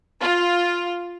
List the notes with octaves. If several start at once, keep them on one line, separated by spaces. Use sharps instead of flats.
F4